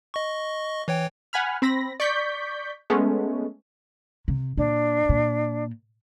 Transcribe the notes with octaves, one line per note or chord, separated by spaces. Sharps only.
D#5 C#6
E3 C#5 G5
F#5 G#5 B5 F6
C4 B5 A#6
D5 C#6 G6 B6
G#3 A3 B3 C#4
C3
A#2 D4
A#2